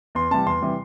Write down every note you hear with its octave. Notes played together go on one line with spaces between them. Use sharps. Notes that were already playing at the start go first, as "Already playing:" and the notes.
E2 C6
C3 E3 G3 A5
E2 C6
C3 E3 G3